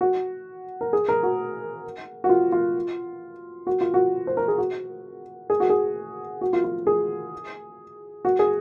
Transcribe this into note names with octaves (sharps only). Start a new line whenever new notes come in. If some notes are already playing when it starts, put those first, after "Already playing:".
F#4
A#4
G#4
A#4
F#4
F#4
F4
F4
F#4
F4
F#4
C5
A#4
G#4
F#4
G#4
F#4
G#4
F#4
F4
F4
G#4
F#4
G#4